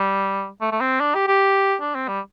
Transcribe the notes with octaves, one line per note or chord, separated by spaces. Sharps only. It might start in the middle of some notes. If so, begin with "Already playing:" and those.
Already playing: G3
A3
A3
C4
D4
G4
G4
D4
C4
G3